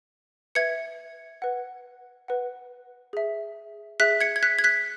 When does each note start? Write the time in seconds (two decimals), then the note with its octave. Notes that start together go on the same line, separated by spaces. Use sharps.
0.55 B4 E5 G#6 C#7
1.42 B4 F#5
2.28 B4 F#5
3.13 G#4 E5
4.00 G#4 E5 F#6 B6
4.21 G#6 C#7
4.36 G#6
4.43 F#6 B6
4.59 G#6
4.64 F#6 B6